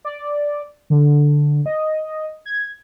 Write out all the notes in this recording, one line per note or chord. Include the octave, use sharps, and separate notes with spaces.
D5
D3
D#5
G#6